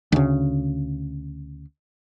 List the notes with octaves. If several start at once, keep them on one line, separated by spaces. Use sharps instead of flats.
D2 C#3